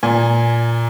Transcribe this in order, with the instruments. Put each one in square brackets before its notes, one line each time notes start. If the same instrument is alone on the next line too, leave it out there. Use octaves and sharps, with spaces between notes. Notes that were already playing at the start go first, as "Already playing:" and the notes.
[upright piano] A#2 G#5